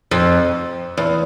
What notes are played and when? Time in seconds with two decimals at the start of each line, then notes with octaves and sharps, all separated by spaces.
0.11 F2
0.97 E2